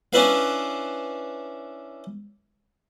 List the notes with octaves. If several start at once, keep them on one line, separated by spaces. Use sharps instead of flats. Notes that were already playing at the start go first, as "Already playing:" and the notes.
C#4 D4 E4 B4 F5